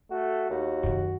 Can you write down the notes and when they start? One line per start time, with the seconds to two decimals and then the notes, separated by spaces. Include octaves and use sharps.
0.11 A3 F#4
0.50 D#2 F#4
0.83 F#2 D#3